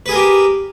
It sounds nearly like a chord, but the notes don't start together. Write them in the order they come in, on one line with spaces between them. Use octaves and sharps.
B4 G#4 A#4 G4